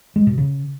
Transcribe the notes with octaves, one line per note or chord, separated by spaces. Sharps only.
G#3
B2
C#3